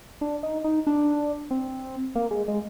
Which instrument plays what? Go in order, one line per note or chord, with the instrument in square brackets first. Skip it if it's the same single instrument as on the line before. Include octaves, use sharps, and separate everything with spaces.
[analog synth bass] D4
D#4
D#4
D4
C4
A#3
G#3
G#3